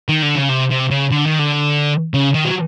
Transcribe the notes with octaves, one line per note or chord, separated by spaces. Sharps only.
D#3
D3
C#3
C3
C3
C#3
D3
D#3
D3
C#3
D#3
F#3